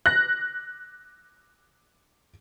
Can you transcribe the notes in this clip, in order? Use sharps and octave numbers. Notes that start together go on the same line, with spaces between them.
F#6 A#6